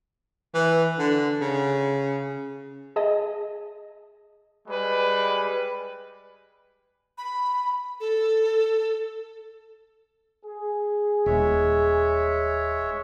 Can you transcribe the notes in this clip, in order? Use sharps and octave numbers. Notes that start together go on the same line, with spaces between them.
E3
D3
C#3
G#4 D#5 A5
G3 G#3 B4
B5
A4
G#4
D#1 G#3 C#5 E5